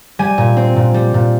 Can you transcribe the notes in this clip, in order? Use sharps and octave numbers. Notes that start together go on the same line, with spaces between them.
G3 G#5
A#2
C4
A#2
G3
A#2